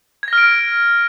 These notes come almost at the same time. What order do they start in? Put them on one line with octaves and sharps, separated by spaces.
G#6 A#6 F6 D7